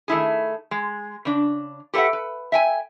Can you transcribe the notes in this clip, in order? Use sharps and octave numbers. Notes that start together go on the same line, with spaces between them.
D#3 A3 E4 G#4
G#3
C#3 D4
G4 A4 B4 D#5 E5 F#5
B4
E5 G5 G#5